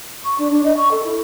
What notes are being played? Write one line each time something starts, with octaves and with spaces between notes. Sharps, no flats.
C#6
D4
D4
D#5
C#6
A4
E4